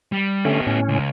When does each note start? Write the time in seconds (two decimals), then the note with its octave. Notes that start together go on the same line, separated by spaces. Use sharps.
0.12 G3
0.45 D3 A3 B3 C#4 G4
0.67 A2 C#4
0.88 C#2